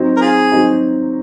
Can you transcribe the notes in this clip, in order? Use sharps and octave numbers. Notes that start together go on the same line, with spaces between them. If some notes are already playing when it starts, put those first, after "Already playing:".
Already playing: F#3 C4 D#4
A#4
F4 G#4
F#3 C4 D#4